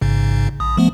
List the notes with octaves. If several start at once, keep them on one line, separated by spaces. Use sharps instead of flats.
A1 G#2 C#3
A#1 D#6
F3 A3 B3